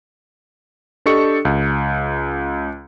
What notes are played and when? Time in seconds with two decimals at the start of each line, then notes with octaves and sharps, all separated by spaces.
1.06 D4 G4 A4 D#5 C#6 C#7
1.45 C#2